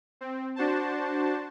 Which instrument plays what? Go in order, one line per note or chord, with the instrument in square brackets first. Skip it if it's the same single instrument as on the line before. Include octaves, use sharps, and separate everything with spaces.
[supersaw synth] C4
D4 F#4 C5 A5